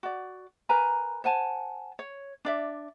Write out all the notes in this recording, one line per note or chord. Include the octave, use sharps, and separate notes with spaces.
F#4 D5
A#4 B4 G#5 A#5
C5 F#5 G#5 A5
C#5
D4 D5 E5